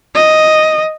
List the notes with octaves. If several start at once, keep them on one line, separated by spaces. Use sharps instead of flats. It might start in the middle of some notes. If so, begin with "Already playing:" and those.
D#5